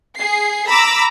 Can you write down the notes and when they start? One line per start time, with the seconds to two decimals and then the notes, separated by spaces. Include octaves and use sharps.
0.17 G#4 C7
0.68 A#5 B5 D6 E6